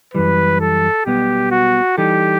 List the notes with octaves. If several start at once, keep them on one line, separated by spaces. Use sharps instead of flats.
F#2 E3 G3 B4
A4
B1 B2 G3 B3 G4
F#4
E3 G3 D#4 G4 A4